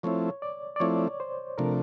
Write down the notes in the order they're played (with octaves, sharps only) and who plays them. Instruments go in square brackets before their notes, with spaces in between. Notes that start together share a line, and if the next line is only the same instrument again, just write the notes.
[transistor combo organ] F3 A3 C4 E4 [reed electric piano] C#5
[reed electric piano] D5
D5
[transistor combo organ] F3 A3 C4 E4 [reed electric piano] C#5
[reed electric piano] C5
[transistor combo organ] C3 F3 A3 D4 [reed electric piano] A#4